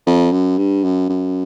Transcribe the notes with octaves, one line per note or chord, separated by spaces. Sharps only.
F2
F#2
G2
F#2
F#2